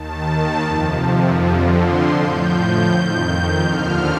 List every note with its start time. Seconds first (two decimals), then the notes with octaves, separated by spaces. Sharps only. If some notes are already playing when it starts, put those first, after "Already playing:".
Already playing: D#2 D#3 A5
0.63 F2 C3 F3
1.38 F2 D3 F3
1.75 C6
2.13 A2 F3 G6
2.88 F2 D#3 G6
3.64 D#2 D3 F3 F6